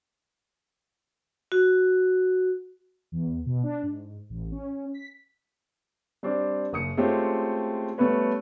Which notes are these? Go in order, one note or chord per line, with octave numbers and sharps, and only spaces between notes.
F#4
E2
B2
D4
G#2
A1
C#4
B6
G3 C4 D4
F#1 D#6 C#7
G#3 A3 C4 C#4 F4 G4
G3 A3 B3 C#4 B4 C#5